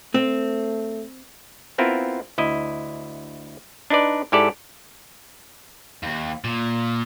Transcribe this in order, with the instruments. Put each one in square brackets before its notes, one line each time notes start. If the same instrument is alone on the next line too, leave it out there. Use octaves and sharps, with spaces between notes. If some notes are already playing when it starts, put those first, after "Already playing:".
[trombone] A3 [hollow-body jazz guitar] C4
[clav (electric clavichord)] B3 C4 E4 F4 A#4
D2 E4 D#5
D4 D#4 B4 D5
G#2 E4 G4 A4 D5 E5
[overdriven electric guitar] D#2
A#2